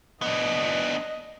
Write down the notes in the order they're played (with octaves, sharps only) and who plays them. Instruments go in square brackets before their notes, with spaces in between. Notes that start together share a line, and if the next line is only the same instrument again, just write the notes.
[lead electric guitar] B3 D4 [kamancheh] D#5